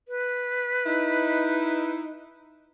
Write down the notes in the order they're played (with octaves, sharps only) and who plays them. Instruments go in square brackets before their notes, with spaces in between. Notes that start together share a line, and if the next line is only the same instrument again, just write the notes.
[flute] B4
[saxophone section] D#4 E4